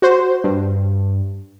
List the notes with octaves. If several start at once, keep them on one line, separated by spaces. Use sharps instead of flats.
F#4 C5
G2